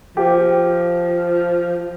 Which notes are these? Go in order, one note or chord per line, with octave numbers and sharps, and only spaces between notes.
F3 G4